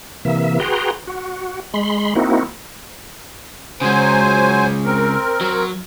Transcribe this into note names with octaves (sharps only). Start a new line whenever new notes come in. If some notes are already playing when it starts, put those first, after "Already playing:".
C3 E3 A#3 E5
F#4 G#4 B4 G5 A#5 C6
F#4
G#3 B5 C6
A#3 C4 D#4 E4 F#4
C#3 F#3 G#3 C5 G#5
C4 A#4
F#3